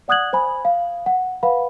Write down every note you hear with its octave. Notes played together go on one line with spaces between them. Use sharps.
D5 F#5 D#6 F#6 G#6 F#7
C5 G#5 B5
F5
F#5
B4 F5 F#5 B5